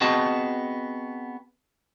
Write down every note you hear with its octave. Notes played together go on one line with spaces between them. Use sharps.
B3 C4 F#4 G#4 D#5 A5